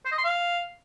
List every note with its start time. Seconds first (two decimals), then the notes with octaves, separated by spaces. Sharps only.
0.05 C5
0.12 D#5
0.18 C6
0.24 F5